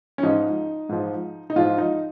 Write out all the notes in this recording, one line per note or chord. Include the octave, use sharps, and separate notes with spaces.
C#4
G#2 F3 D#4
G#2 F3
D#4
G#2 F3 F4
D#4